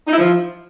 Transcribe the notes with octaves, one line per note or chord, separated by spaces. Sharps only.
D#4
E4
F3